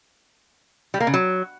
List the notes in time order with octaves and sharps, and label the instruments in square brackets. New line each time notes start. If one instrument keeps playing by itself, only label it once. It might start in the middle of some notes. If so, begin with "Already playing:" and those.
[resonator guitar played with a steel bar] G3
A#3
C#3
F#3